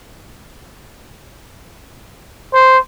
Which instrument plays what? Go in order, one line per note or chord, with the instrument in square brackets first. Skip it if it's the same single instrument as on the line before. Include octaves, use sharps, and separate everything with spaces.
[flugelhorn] C5